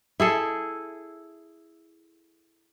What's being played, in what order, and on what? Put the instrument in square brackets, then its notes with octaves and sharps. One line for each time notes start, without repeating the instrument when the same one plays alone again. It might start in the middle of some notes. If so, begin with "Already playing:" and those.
[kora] E4 G#4 A4